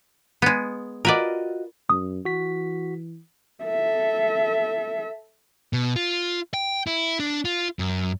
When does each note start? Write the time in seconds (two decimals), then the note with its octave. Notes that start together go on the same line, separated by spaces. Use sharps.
0.42 G#3 B3
1.05 F4 F#4 A#4 B4 D5 D#5
1.90 F#2 D#6
2.25 E3 F#4 B6
3.64 A4 E5
5.73 B2
5.96 F4
6.54 G5
6.87 E4
7.20 D4
7.45 F4
7.79 F#2